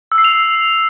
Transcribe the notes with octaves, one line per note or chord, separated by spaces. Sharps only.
E6
C7
F7